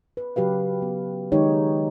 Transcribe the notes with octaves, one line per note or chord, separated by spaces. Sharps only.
B4
C#3 F#3 G4 B4 F5
B3
D#3 G#3 D#4 G4 C#5